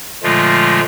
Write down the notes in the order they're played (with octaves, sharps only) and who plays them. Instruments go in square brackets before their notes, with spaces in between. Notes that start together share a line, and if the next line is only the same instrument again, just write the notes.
[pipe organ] A#2 D3 F3 G#3 A3 F4